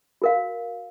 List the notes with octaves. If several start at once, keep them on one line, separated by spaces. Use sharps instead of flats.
F#4 A#4 F5